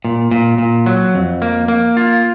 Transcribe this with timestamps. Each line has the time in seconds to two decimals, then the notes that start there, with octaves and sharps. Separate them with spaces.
0.05 A#2
0.31 A#2
0.58 A#2
0.86 F#3
1.15 F2
1.42 A#3
1.68 A#3
1.97 F4